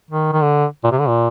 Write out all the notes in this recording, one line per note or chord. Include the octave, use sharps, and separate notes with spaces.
D#3
D#3
D3
A#2
C3
D3
A#2